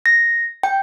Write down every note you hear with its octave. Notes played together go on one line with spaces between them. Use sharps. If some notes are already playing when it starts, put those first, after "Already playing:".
A#6
G5